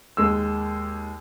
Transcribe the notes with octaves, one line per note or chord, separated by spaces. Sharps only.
D#2 G#3 E6